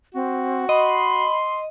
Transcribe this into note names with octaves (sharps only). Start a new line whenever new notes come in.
C4 F#4
D#5 B5 C6